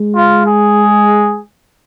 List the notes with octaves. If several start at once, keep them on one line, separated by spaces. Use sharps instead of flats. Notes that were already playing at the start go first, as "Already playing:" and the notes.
Already playing: G#3
F4
G#4